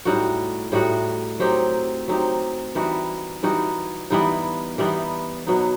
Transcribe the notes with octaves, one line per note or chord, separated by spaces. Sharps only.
A2 G3 D#4 F#4
A2 G3 D#4 F#4
F#3 C4 D#4 G4
F#3 C4 D#4 G4
E3 G3 D#4 F#4
E3 G3 D#4 F#4
E3 G3 B3 D#4
E3 G3 B3 D#4
B2 F#3 B3 D#4